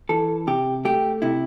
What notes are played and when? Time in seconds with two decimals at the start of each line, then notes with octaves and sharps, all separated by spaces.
0.09 E3 A4
0.47 C3 G4
0.85 A3 G4
1.22 C3 E4